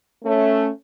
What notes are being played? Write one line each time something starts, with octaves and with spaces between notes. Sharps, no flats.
A3 C#4